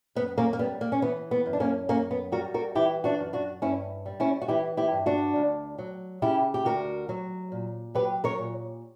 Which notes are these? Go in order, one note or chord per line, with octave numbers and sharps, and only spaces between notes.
F#2 B3
A#3 C#4
A#3
G3 B3
A#3
C#4
E3 B3
B3
F#2
D4
A#3 C#4
F#2 A#3 C#4
B3
G3 F#4 A#4
F#4 A#4
E3 E4 G4
D4 F#4
F#2
D4 F#4
G2 C#4 E4
G3
C#4 E4
F#4
E3 E4 G4
E4 G4
G2
D4 F#4
D2
F#3
C#3 E4 G4
G4
D2 F#4 A#4
F#3
A#2
F#3 G4 B4
A#4 C#5
A#2